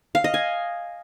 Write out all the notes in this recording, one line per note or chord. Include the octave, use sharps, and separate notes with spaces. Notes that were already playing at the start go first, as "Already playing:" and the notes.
F5
D#5
G#5